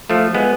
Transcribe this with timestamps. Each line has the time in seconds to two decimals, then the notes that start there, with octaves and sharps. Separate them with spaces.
0.10 F3 A3
0.35 G#3 B3